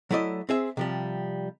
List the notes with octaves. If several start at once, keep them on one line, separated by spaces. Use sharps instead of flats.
F#3 A3 E4 D5 D#5
C4 G#4 E5
C3 F3 G3